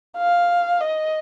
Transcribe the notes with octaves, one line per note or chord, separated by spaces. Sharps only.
F5
D#5